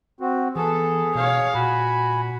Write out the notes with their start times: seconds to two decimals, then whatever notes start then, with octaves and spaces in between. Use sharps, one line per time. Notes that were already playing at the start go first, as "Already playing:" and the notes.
0.20 C4 F#4
0.56 E3 B3 G#4 A4
1.15 B2 C#5 F5
1.55 A#2 F#4 G#5 B5